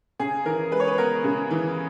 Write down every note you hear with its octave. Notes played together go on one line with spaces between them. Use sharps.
C#3 G#4
E3 A#4
G#3 B4
C#5
B4
B3 A#4
C#3
E3